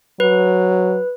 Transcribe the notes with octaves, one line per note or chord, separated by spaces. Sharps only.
F#3 B4